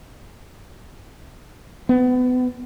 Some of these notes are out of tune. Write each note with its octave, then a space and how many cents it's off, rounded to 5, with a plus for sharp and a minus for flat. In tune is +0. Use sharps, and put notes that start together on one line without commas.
B3 +30